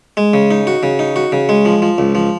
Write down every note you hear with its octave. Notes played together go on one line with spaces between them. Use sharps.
G#3
C#3
D#4
F#4
C#3
D#4
F#4
C#3
G#3
F3
F3
C#2
F3